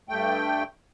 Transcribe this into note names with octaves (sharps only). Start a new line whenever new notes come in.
G2 A3 G5